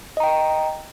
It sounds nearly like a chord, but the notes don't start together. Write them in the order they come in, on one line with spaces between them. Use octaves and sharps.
D#5 A#5 G5